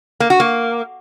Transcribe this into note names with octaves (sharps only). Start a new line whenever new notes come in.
A#3
F#4
A#3